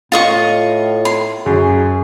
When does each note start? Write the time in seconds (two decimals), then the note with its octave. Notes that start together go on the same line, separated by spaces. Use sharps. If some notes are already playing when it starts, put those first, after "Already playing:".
0.12 A2 F4 D#5 C#6
1.05 C6
1.46 F#2 G#4